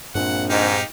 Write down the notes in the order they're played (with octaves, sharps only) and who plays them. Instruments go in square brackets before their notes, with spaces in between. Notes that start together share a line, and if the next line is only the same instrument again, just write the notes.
[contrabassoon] A#1 [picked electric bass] G2 A#2 C4 [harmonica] F#5
[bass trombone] G#2 [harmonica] D#4 G4 F5